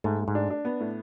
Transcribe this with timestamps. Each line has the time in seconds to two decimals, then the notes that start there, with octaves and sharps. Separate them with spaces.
0.04 G#2 A3
0.20 A3
0.28 G#2
0.35 D4
0.50 D4
0.65 B3
0.80 A2